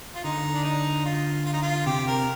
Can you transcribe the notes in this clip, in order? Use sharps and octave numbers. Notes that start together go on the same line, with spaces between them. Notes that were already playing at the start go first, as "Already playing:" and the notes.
F4
D3 D#4
D4
D#4
F4
F4
D#4
F4
C3 G4
A#4